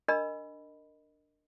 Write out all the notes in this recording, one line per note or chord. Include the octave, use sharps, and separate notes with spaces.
D4 A#4 D#5 B5